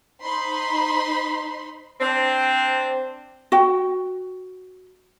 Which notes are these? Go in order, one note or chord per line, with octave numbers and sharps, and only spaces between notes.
D#4 C5 B5 C6
C4 D4
F#4 G5